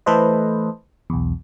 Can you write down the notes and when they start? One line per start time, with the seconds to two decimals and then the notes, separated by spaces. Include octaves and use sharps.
0.06 E3 A3 A4 B4 C5 D#5
1.10 B1 E2